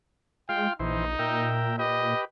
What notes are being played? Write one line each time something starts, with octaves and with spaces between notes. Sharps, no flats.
G#3 F4 F5 G5 C6
A#1 E3 D#4 C5
A#2 A#4 E5 G5
G4 B4 D#5